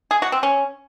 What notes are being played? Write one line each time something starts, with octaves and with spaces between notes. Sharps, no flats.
G#4
F#4
C4
C#4